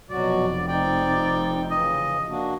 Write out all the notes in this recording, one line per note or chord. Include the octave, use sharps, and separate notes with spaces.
F1 B2 F#3 F#4 D5
C4 D#4 D5 G5
C#3 E3 D#5
A#3 D4 F#4